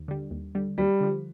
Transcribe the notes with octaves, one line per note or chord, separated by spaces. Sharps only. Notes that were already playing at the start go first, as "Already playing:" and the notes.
Already playing: D#2
D3 G3
D#2
D3 G3
D#2 G3
D3 F3